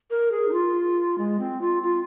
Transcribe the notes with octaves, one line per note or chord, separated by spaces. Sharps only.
A#4
G#4
D#4
F4
G#3
C4
F4
F4